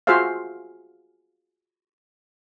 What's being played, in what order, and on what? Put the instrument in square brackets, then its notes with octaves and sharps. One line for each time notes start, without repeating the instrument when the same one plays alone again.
[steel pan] F4 F#4 G#4 C5 E5 F5